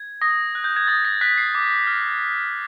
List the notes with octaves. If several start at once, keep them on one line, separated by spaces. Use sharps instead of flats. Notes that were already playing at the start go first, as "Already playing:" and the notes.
Already playing: G#6
D#6 A#6
F#6
G6
G#6
D#6 A6
A#6
F#6 B6
C7
D6
F6